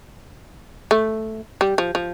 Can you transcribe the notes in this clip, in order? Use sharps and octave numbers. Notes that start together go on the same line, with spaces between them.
A3
G3
F3
F3